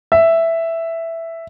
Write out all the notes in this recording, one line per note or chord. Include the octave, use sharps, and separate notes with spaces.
E5